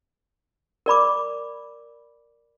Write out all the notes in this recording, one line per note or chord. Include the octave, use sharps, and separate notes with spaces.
A#4 D5 B5 D6